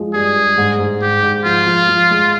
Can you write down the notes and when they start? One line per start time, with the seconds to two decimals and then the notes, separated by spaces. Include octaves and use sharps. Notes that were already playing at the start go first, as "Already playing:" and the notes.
Already playing: F3 G#3
0.14 G2 G#4
0.36 G2
0.58 G#2
0.79 G#2
1.01 G#2 G4
1.23 G#2
1.45 F3 F4
1.67 F3
1.89 F3
2.10 G#3